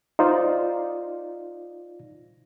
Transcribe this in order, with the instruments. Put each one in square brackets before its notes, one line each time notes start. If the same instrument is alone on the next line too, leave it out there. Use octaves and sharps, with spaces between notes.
[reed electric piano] D#4 F4 C5 D5